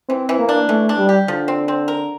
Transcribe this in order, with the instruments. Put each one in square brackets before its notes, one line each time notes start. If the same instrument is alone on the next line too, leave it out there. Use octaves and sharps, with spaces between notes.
[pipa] E3 [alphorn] C4
[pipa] E3
[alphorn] A#3
[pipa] D4
[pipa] E3 [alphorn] A3
[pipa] D4
[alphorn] G3
[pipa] G4
[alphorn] D3 [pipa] F3
[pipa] C4
C4
A#4